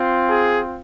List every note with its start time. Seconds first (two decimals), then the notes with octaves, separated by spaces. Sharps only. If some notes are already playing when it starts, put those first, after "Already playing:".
Already playing: C4 F4
0.30 G#4